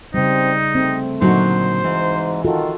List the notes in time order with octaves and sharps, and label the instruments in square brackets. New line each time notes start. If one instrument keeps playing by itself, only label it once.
[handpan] C#3 G3 [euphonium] C4 [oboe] D#4
[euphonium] A3 [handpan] C4
[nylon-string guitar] A#2 D3 F#3 [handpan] D#4 F#4 [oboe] C5
[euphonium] G#2 [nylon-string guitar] E3
[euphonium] D#3 [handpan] F4 F#4 A4